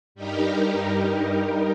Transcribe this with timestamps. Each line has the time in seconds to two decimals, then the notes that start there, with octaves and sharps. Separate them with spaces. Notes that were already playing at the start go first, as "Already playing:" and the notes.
0.15 G2 G3 D#4 G4 A#4